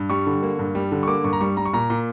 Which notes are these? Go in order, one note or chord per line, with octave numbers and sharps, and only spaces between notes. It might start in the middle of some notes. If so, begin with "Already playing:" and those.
Already playing: G2
G3 C#6
D3
A#3
G2
G3
D3
C#6
A#3 D6
G2 C#6
A#5
G3 C#6
G3 A#5
C#6
A#2 A#5
A#2